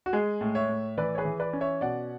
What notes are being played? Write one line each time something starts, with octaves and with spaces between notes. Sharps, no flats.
F#4
G#3 G#4
A2
C#5 E5
A2
E3 B4 D5
C#5
G#4 B4
E3
B4 D5
C#4
C#5 E5
B2 D5 F#5